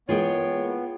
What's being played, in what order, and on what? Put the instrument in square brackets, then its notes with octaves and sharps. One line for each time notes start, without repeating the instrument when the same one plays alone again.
[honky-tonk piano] E3 G#3 A#3 [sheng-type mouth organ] B3 [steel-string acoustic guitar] F4 G#4 G5 [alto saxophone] C#5